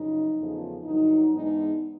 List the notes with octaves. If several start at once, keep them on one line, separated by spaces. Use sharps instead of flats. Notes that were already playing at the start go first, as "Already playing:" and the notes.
Already playing: F#2 C#3 F3 D#4
E2 C#3 F3 A3
G2 D3 F#3 D#4
G#2 E3 G#3 B3 D4 D#4